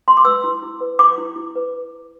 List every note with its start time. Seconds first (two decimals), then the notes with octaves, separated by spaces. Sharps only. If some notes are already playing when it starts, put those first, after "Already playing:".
0.08 C6
0.17 D6
0.25 B4 E6
0.44 E4
0.62 E4
0.81 B4
0.99 B4 D6
1.18 E4
1.36 E4
1.56 B4